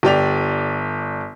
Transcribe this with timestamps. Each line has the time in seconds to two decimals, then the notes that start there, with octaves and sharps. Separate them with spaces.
0.03 G1 G4 D5 F7